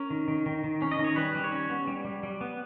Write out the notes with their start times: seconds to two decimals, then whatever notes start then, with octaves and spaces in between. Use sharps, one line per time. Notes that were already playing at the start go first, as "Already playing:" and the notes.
Already playing: C#4 A#4
0.10 D#3
0.28 D#3
0.46 D#3
0.64 D#3
0.82 C#4
0.92 D#5
0.99 D#3
1.04 C#5
1.16 G3 B4
1.35 G3
1.44 C#5
1.52 C#4
1.70 B3
1.87 G3
2.05 G3
2.23 G3
2.41 B3